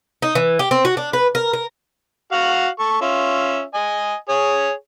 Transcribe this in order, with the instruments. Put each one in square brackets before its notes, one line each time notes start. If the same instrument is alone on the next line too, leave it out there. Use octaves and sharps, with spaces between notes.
[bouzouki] D#4
E3
G4
C4
F#4
D4
B4
A#4
A#4
[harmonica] F#4 F5 F#5
A4 C#6
C#4 F4 E5
D#5 G#5
G#4 C#5